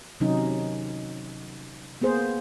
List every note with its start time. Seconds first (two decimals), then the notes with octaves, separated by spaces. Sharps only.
0.20 C3 D#3 F#3 C#4 D#4
2.01 A#3 B3 G#4 C5